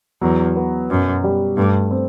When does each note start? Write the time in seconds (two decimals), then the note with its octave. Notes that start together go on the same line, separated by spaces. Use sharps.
0.21 E2 F#3
0.56 B3
0.90 F#2 B2
1.24 G3
1.57 G2 A3
1.91 C4